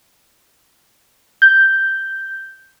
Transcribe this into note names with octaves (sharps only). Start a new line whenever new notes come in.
G6